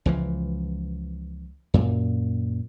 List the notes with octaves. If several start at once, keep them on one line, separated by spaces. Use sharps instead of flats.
C#2 E3 F3
F#2 A#2